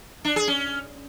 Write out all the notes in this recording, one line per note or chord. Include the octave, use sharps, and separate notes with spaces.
D4
G#4
C#4